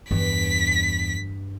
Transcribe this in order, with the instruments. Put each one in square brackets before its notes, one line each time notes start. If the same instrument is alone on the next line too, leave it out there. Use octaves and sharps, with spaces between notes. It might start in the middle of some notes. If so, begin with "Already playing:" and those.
[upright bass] E2 [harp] G2 [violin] B6